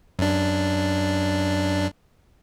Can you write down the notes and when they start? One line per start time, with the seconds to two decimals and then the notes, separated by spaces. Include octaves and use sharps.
0.19 F#2 D4